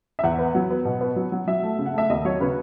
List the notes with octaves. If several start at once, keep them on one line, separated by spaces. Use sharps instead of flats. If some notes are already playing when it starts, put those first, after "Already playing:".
E5
E2 F#5
B3
F#3
B3
B2
B3
F#3
F#3
F#3 E5
A3
C#3
F#5
A3 E5
D#2 D#5
F#3 C#5
C#3 B4